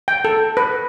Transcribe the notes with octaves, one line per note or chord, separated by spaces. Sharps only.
G5
A4
B4